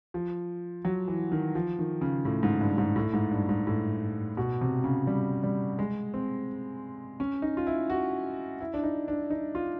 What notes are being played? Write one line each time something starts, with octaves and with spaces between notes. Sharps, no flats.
F3
F#3
E3
D#3
F3
D#3
C#3
A2
G#2
G2
G#2
A2
G#2
G2
G#2
A2
B2
C3
C#3
G3
G3
G#3
C4
C#4
D#4
F4
E4
F#4
E4
D4
D#4
D4
D#4
F4